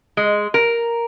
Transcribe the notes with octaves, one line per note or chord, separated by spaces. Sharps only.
G#3
A#4